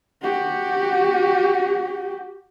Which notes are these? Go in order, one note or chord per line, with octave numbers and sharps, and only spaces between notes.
F#4 G4